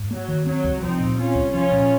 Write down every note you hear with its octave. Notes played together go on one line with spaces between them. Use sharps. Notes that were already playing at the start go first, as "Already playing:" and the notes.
Already playing: G#2
F#3 A#3
D#3
F#3 C4
C2
F3 C4 D#4
A#2
C4 C#4 F4
C2
F3 C#4 F4
A#2